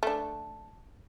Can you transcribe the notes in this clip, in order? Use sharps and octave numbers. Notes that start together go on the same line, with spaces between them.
A3 D4